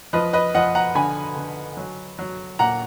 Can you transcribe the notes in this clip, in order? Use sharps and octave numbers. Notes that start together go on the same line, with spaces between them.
F3 B4 D#5
B4 D#5
F3 D#5 F#5
F#5 A#5
D3 G#5 B5
D3
F#3
F#3
A#2 F#5 A#5